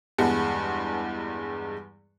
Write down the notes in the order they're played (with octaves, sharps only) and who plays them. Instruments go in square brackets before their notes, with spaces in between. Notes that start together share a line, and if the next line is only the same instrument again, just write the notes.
[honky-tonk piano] E2 G2 G#3 F#5 A5